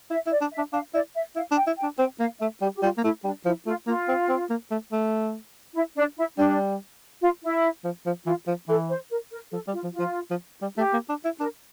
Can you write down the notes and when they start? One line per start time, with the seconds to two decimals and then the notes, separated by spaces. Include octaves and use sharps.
0.10 E4 E5
0.27 E4
0.31 D5
0.41 D4
0.52 E5
0.58 D4
0.73 D4 F5
0.94 E4 D5
1.15 E5
1.36 E4 F5
1.51 D4
1.57 G5
1.67 E4
1.78 G5
1.83 D4
1.99 C4 G5
2.19 A#3 F5
2.40 A3 E5
2.61 G3 G4
2.76 G4
2.82 G3 F4
2.97 A#3
3.04 A3 E4
3.24 G3 D4
3.45 F3 E4
3.66 A3 F4
3.87 A#3 F4
4.08 C4
4.29 C4
4.50 A#3
4.71 A3
4.92 A3
5.75 E4
5.96 D4
6.17 E4
6.38 G3 D4
7.22 F4
7.43 E4
7.84 F3
8.06 F3
8.26 E3 F4
8.47 F3
8.68 E3 A4
8.89 C5
9.10 A#4
9.31 A#4
9.52 F3 A4
9.67 G3
9.73 F4
9.83 F3
9.93 F4
9.99 F3
10.31 F3
10.62 G3
10.77 A3 G4
10.93 A#3
11.09 D4
11.25 E4
11.40 D4 A#4